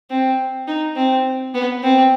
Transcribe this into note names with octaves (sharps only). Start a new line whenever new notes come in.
C4
D#4
C4
B3
C4